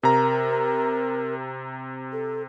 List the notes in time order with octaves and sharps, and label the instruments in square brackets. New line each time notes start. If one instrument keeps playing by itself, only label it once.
[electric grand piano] C3 A#5 [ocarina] A#4
[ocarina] A4